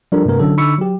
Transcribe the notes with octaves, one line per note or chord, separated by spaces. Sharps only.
F3 G3 D4 A4 A#4
G2 C3 A3 B3 A#4
D3 F#3 C#4 A4
D3 D#4 B5 C#6 E6 C#7
F#3 G4